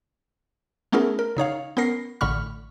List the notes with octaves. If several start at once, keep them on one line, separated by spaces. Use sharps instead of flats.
A3 B3 C#4 E4 G#4 A#4
A#4
C#3 D#4 C#5 F5
B3 C#4 A#4 A#6 C7
A1 A2 D3 B5 C#6 F6